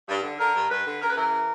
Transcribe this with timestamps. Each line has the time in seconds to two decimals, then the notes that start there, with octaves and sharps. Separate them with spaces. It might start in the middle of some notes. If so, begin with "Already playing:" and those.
0.09 G2
0.23 D3
0.39 D3 A#4
0.55 G2
0.70 G2 B4
0.86 D3
1.01 C#3 A#4
1.10 B4
1.17 E3 A#4